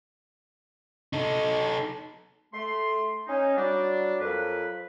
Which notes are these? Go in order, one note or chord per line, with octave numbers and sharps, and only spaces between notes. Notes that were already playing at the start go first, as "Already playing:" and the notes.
D#4 A4
A3 C6
C#4 D#4
F#3 G3 D4
F2 F3 F#3 A#4 B4